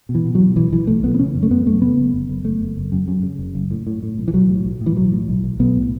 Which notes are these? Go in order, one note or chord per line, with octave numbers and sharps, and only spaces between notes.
B2
E3
B2
F#3
B2
B1 E3
B1 E3
B1 A3
B1 B3
B3
C#3 C#4
F#2
A3
F#2 B3
F#2 A3
C#3 B3
F#1
F#1
F#1
F#1 A3
F#1
F#1
F#2
F#2
C#3
F#1
F#1
A2
A2
A2
B1
E3
B1 F#3
A2
B1
A2
E3
B1 F#3
A2
B1
B1
B1 B3
A2